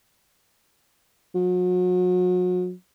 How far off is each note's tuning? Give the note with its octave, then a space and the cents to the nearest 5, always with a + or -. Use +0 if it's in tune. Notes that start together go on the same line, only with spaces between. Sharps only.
F#3 -35